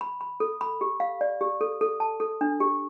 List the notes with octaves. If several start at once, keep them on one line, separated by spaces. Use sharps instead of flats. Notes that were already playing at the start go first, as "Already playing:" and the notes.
B5
B5
A4
B5
G4
F5
D5
G4
A4
A4
A5
A4
D4
G4